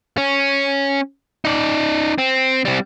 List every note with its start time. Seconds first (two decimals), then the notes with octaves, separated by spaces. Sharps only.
0.18 C#4
1.45 D#4 D5
2.18 C4
2.65 G3 C4